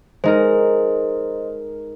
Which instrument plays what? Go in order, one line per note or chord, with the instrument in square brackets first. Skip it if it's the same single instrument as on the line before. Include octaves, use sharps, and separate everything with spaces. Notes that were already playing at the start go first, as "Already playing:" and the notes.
[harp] G#3 D#4 A#4 [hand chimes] C5 D#5